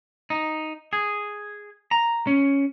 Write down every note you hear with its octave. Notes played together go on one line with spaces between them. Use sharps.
D#4
G#4
A#5
C#4